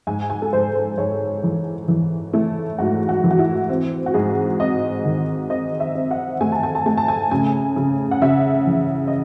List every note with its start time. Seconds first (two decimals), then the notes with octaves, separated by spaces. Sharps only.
0.07 G#2 G#5
0.30 G#5
0.42 A4
0.53 G#2 C5
0.75 C5
0.98 G#2 C#5
1.43 E3
1.88 E3
2.33 A3 E4
2.79 G#2 F#4
3.09 F#4
3.24 E3
3.31 F#4
3.39 E4
3.69 C4
4.06 F#4
4.14 G#2 G#4
4.60 C4 D#5
5.05 D#3
5.50 C4 D#5
5.80 E5
5.95 C4
6.11 F#5
6.41 A3 G#5
6.52 A5
6.63 G#5
6.75 A5
6.86 A3 G#5
6.97 A5
7.08 G#5
7.31 C#3 G#5
7.76 C#3
8.11 F#5
8.22 C#3 E5
8.67 E3
9.07 D#5